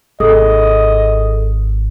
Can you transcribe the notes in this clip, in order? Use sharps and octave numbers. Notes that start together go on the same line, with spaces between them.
G#1 G#4 A4 D#5 D#6